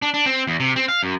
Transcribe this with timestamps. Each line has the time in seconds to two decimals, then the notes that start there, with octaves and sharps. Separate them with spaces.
0.02 D4
0.14 D4
0.26 C4
0.47 E2
0.60 C3
0.76 C4
0.88 F5
1.03 F#2